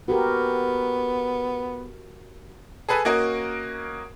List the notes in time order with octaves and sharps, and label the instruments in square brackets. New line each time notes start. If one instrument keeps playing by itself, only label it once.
[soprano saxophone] B3 [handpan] F#4 G4 A#4
[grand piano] G#4 A4 B4 G#5
A#3 C#4 F#4 A#4 D#5